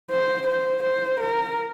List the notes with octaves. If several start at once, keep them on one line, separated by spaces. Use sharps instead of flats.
C5
C5
C5
A#4